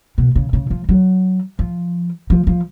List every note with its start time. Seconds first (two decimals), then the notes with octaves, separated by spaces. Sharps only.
0.18 B2
0.36 C#3
0.53 C#3
0.70 F3
0.89 F#3
1.59 F3
2.30 F3
2.47 F3